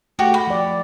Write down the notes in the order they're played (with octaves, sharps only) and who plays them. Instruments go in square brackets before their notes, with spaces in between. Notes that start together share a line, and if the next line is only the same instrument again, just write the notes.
[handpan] A3 [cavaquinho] F#4 G4
[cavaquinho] B5
[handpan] F3 D5